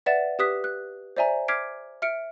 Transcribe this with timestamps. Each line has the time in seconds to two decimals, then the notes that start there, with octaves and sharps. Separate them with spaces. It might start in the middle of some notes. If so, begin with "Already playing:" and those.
0.06 B4 D5 E5 F#5 A6 E7
0.39 G4 B4 D#6 F#6 B6
0.64 F#6
1.17 C5 D5 E5 G#5 A#5
1.48 D6 F6 G#6 B6 C7 D7
2.02 E5 F6 C#7 D7